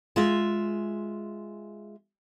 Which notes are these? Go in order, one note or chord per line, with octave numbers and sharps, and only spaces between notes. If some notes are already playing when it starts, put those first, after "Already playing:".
G#3 F4 E5